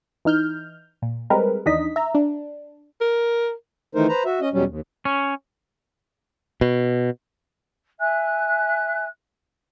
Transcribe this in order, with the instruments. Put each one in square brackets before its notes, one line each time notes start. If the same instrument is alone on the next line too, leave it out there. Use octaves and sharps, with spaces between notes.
[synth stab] E3 D#4 F6 G6
A#2
G3 G#3 C4 A#4 B4
D#2 E3 D4 D#4 D#5 B6
E5 A#5
D4
[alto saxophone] A#4
[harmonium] D#3 E3 A3 D#4 A#4 C5
B4 C5 A#5
F#4 E5
C#4 D#5
E2 B2 F#3 G3 C#4
D#2
[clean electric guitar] C#4
[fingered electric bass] B2
[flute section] E5 G#5 F#6